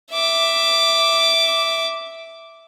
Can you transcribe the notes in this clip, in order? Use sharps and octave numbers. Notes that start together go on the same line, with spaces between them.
E5 D6